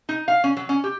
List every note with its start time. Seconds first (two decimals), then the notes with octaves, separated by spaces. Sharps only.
0.09 D#4
0.28 F5
0.44 C#4
0.57 F#3
0.69 C#4
0.84 G4